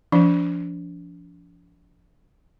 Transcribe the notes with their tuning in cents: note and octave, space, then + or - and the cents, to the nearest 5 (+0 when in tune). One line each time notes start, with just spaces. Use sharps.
F3 -20 D4 -40 C5 +0